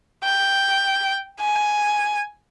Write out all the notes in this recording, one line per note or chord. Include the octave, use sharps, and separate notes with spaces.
G5
G#5